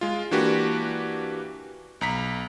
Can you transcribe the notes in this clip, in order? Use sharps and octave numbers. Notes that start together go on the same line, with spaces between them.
G#3 F4
E3 A#3 D4 F#4 G4 B4
B1 A#5 B6